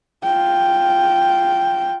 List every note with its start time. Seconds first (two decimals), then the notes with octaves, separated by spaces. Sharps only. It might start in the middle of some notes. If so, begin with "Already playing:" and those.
0.23 F4 G5